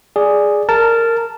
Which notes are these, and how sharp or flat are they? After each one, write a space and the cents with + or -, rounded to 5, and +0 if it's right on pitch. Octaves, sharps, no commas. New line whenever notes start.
G#4 +0 D5 +0
A#4 -15 A5 +0